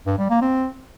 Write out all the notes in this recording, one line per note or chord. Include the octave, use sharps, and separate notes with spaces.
G2
G3
A#3
C4